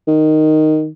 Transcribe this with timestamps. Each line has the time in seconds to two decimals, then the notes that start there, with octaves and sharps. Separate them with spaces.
0.07 D#3